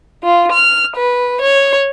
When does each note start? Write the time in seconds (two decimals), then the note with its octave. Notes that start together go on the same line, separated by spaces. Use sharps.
0.23 F4
0.53 F6
0.96 B4
1.41 C#5